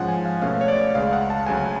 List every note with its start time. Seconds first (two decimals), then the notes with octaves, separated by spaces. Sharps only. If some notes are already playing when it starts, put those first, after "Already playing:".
Already playing: G#2 F3 G#3 C#4 F#5
0.08 G#5
0.25 F5
0.42 B2 A3 C#4 F5
0.61 C#5
0.68 D5
0.95 C#2 C#3 G#3 F5
1.13 F#5
1.30 A5
1.46 D2 C#3 F#3 G#5